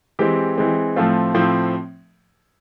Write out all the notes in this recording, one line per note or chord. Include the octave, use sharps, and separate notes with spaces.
E3 G#3 C4 G4
E3 G#3 C4
A2 F3 A3 C4 F4
A2 F3 A3 C4